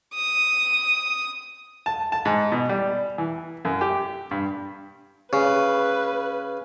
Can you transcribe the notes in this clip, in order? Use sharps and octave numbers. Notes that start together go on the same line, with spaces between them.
D#6
A5
A5
G#2
B2
G3
E3
F#2
G4
G2
C#3 B4